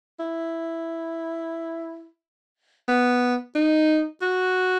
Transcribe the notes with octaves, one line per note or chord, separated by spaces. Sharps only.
E4
B3
D#4
F#4